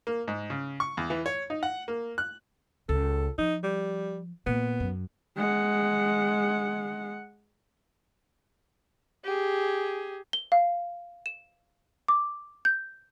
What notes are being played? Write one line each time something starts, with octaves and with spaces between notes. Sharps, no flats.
A#3
G#2
C#3
C#6
E2
E3
C#5
D#4
F#5
A#3
F#6
C#2 A4
F3 D#4
G3
A#2 B3
F#2
G#3 F#5
G4 G#4
G7
F5
E7
D6
G6